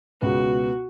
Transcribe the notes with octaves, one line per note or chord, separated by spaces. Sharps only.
C#2 B2 B3 F#4